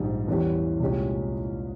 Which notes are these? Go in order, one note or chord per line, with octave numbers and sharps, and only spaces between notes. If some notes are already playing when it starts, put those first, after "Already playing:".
Already playing: A#1 G#2 G3
E2 E3 G3 C#4 G4
C2 A#2 G#3 C#4 G4